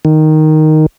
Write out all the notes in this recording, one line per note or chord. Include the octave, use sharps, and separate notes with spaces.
D#3